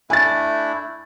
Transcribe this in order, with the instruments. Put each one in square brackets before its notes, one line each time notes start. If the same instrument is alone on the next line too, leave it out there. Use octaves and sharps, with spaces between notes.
[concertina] A3 D4 E4 [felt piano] G#5 A6